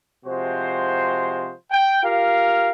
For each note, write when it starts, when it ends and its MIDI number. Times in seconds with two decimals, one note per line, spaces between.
0.25 1.52 48
0.25 1.52 53
0.25 1.52 56
0.25 1.52 66
0.25 1.52 72
1.71 1.98 79
2.03 2.71 65
2.03 2.71 67
2.03 2.71 70
2.03 2.71 77